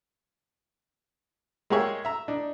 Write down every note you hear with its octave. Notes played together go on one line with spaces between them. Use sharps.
G#3 A#3 G4 G#4 C#5 E5
E5 A#5
D4 D#4